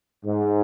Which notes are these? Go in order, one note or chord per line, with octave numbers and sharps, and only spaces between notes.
G#2